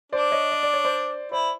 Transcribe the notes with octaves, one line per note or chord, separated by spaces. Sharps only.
D4 C5 D5
C#5 D#5
D#5
D5
C#5
C5 D5
E4 C5 D5